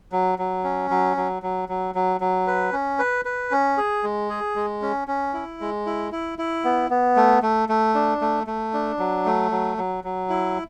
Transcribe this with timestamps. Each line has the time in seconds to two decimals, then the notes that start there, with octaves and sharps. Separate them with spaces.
0.12 F#3
0.39 F#3
0.64 C#4
0.90 F#3
1.17 F#3
1.42 F#3
1.69 F#3
1.95 F#3
2.21 F#3
2.47 B4
2.73 C#4
2.99 B4
3.25 B4
3.51 C#4
3.77 G#4
4.03 G#3
4.30 G#4
4.56 G#3
4.82 C#4
5.08 C#4
5.34 E4
5.61 G#3
5.86 E4
6.12 E4
6.39 E4
6.64 B3
6.90 B3
7.16 A3
7.42 A3
7.69 A3
7.95 D4
8.21 A3
8.47 A3
8.74 D4
8.99 F#3
9.26 A3
9.51 F#3
9.77 F#3
10.04 F#3
10.29 E4